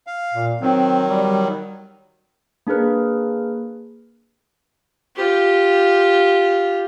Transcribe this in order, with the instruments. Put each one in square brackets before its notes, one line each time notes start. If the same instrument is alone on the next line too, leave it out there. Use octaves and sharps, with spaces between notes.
[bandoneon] F5
[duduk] A#2
[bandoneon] D#3 F#3 [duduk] C4
[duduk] G3
[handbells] A#3 D4 G#4 A#4 B4
[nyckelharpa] F4 G4